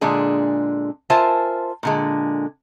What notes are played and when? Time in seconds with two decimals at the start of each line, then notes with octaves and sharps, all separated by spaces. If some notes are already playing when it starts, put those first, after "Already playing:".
0.01 A#2 D3 G#3 D4 G#4
1.10 F4 A#4 C5 E5 G#5 A5
1.83 A#2 D3 G#3